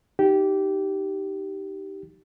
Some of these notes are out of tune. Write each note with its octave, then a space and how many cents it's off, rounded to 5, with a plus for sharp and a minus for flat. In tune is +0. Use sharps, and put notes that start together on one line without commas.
D#4 +0 G4 -15